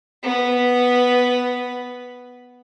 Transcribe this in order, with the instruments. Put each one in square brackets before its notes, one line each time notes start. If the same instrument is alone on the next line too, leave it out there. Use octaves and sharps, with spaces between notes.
[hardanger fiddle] B3 B4